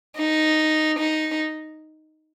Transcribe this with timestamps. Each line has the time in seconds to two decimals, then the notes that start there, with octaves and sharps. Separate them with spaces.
0.17 D#4
0.99 D#4